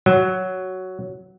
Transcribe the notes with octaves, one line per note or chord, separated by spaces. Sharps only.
F#3